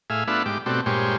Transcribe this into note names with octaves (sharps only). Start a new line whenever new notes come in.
A2 G#4 E5 F5
A3 B3 D4 F4 E5 F#5
G#2 G4 D6
B2 A3 C4 F#4 G4 D5
G2 A#2 G#3 G4 C5 C#5